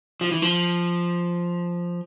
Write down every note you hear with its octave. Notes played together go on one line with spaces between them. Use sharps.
F3
E3
F3